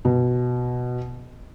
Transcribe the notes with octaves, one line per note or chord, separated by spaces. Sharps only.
B2